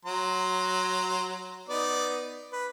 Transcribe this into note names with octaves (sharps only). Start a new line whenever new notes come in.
F#3 A#5 C6
B3 D#4 D5
B4